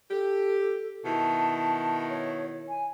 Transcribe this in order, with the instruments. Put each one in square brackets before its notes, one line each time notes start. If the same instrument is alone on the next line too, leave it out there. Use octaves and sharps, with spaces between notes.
[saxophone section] G4 [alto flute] A4
[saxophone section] B2 D#3 E4 [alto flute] A5
[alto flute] C#5
G#5